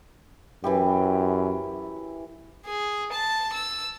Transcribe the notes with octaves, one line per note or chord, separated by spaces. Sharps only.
F#2 E3 E4 G4
G#4
A5
E6